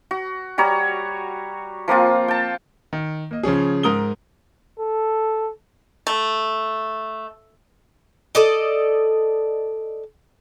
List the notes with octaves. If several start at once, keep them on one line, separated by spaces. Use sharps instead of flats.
F#4
G3 F#4 C#5 A#5
F3 A#3 C4 F4
G5 A5
D#3
A#3 D#5
C#3 F3 C#4 G#4
G#2 A#4 D#6 G7
A4
A3
A4 D5 D#5